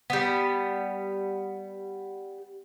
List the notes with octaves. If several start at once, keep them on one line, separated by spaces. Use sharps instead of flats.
G3 B3